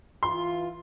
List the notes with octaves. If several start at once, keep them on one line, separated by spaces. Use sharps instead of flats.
E3 F4 C6